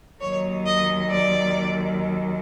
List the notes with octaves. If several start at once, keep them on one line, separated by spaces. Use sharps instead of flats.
D#2 D#3 F#3 C#5
D#5
D5